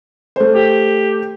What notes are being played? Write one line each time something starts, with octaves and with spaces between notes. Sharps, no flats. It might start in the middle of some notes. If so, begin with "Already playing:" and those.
A3 C5
G4